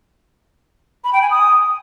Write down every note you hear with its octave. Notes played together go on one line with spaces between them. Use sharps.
B5
G5
G#5
D#6